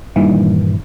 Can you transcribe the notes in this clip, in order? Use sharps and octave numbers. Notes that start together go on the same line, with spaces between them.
G2 A#2 D#3 E3